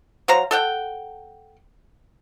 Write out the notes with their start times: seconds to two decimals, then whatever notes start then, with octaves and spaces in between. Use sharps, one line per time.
0.28 F#3 C5 F5 A#5
0.51 A4 F#5 G5